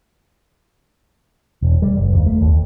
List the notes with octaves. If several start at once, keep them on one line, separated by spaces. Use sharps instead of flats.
E1
G3
F#1
D#2
A3
D#2